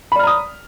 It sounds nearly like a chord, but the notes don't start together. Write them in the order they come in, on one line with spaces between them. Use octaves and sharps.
B5 D5 F6 A#5 D#6